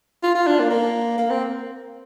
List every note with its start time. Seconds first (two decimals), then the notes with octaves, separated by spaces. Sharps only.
0.23 F4
0.35 F4
0.47 D4
0.59 A#3
0.70 A#3
1.18 A#3
1.30 C4